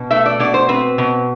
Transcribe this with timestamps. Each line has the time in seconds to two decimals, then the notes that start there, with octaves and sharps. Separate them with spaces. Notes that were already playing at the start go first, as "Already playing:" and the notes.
Already playing: B2
0.11 A3 E5
0.26 D5
0.40 B2 D5
0.54 C5
0.69 C4 B4
0.98 B2